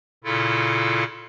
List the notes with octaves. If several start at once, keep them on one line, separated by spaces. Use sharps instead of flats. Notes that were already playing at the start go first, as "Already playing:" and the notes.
A#2 C#3 E4 F4 A4